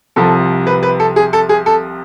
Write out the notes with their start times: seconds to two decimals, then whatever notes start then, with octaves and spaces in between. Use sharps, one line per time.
0.16 C2 C3 F3 A4
0.67 B4
0.83 B4
1.00 A4
1.16 G#4
1.33 A4
1.49 G#4
1.66 A4